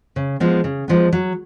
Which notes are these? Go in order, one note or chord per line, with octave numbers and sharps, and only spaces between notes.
C#3
F3 G#3 B3
C#3
F3 G#3 B3
F#3